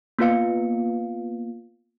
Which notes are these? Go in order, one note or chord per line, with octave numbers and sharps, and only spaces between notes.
A#3 B3 F4 B4 F5 C#7